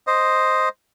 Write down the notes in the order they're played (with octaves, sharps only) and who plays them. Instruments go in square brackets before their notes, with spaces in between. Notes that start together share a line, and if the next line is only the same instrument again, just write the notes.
[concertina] C5 D#5